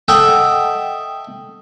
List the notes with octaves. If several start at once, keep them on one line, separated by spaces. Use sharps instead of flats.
A4 D#5 E5 F#5 G5